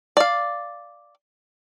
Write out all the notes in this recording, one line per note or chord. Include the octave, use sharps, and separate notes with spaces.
D5 F5